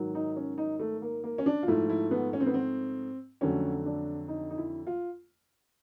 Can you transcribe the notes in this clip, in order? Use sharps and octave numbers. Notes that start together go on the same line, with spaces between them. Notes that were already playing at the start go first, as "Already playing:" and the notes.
Already playing: G#2 D#3 F#3
D#4
C#4
D#4
A3
A#3
A#3
C#4
D4
F4
G#2 F3 A3 E4
E4
B3
C#4
C4
B3
C4
F2 D3 F#3 A3 C#4
D4
D#4
D#4
E4
F4